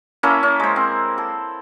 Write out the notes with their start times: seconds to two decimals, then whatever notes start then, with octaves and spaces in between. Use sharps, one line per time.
0.23 A#3 C#4 E4 A4
0.43 C#4
0.60 G#3 C5
0.76 C4
1.18 A4